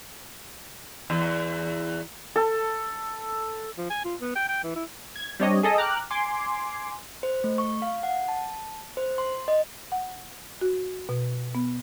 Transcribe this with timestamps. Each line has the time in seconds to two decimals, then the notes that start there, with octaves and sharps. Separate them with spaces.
1.10 E2
2.36 A4
3.78 F3
3.90 G#5
4.05 F4
4.21 B3
4.36 G5
4.48 G5
4.64 E3
4.76 E4
5.16 G#6
5.40 G3 C4 D4 C#5 D#5
5.63 G#4 A4 D#5 A5
5.78 G5 A#5 D6 F6 F#6
6.11 G#5 C6 D6
7.23 C5
7.44 A3
7.58 C#6
7.82 F5
8.03 F#5
8.28 A5
8.97 C5
9.18 C6
9.48 D#5
9.92 F#5
10.61 F#4
11.09 B2
11.55 B3